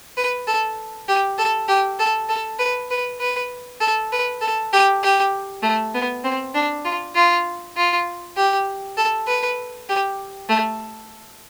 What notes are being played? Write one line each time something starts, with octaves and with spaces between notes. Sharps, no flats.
B4
A4
G4
A4
G4
A4
A4
B4
B4
B4
A4
B4
A4
G4
G4
A3
B3
C4
D4
F4
F4
F4
G4
A4
B4
G4
A3